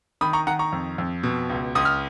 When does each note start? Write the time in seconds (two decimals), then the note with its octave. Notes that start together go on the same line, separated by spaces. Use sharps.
0.21 D#3 B5 D#6
0.33 A#5 C#6
0.47 D#3 F#5 A#5
0.59 A#5 C#6
0.73 F2
0.98 F2
1.23 B2
1.50 C#2
1.75 C#2 D#6
1.85 F6